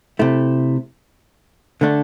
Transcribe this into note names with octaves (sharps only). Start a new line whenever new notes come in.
C3 A3 E4
D3 A3 D4